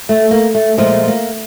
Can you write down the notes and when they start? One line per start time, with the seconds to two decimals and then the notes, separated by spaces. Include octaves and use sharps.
0.09 A3
0.31 A#3
0.55 A3
0.77 A#2 F3 G#3 A3
1.08 A#3